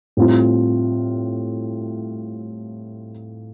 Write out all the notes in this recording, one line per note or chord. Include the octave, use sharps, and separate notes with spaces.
A2 G3 C4 F4